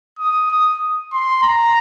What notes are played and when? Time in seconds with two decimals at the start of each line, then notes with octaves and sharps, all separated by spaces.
0.19 D#6
0.50 D#6
1.13 C6
1.42 A#5